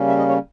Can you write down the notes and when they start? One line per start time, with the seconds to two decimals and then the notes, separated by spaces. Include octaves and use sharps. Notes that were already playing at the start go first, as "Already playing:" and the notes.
Already playing: C#3 G3 A#3 C#4
0.08 E5
0.18 D#5
0.29 C#5